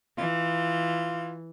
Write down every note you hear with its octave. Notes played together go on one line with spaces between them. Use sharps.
E3 F4